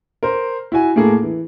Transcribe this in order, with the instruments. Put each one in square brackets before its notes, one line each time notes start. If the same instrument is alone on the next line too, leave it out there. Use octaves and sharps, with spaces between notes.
[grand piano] A#4 C5
E4 F#4 G#5
A2 A#3 G#4 A4
E3